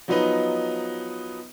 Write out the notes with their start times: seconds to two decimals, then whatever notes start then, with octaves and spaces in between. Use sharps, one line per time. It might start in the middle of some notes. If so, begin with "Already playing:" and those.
0.08 F3 F#3 B3 D#4 B4 D#5